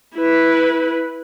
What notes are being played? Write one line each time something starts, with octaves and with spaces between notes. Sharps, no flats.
E4 B4